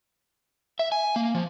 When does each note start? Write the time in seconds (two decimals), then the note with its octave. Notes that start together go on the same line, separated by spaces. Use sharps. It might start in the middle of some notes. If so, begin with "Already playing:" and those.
0.79 E5
0.92 G#5
1.16 A#3
1.35 F3